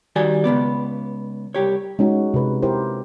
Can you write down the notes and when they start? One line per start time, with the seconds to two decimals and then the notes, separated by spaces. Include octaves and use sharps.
0.16 D#3 G3 F#4 G4 D5 G#5
0.44 C#2 G#2 B3 D5
1.55 C2 G4 C#5
1.99 G#3 C#4 D#4 F#4
2.34 C3 B4
2.62 E4 G4 A#4 C5